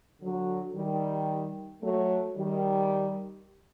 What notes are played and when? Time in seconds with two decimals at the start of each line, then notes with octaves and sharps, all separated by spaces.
0.22 D3 F#3
0.76 D#3 G3
1.82 F#3 A3
2.36 D#3 G3